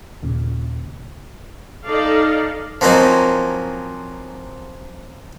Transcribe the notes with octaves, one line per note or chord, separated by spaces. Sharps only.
D#2 A#2 C#3
D#4 A4 D5 F5
F3 F#3 A#3 C4 C#4 D#4